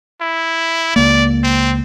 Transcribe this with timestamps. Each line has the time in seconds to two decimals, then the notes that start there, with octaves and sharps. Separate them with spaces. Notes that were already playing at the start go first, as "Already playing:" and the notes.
0.21 E4
0.96 C#2 A#3 D5
1.43 C4